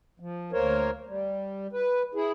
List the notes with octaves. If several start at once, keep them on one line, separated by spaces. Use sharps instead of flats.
F3
D2 A#3 A#4 C5 C#5
G3
B4
E4 G#4